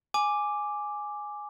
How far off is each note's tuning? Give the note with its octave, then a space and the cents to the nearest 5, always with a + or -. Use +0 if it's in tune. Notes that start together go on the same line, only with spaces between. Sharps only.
G#5 +0 D6 +0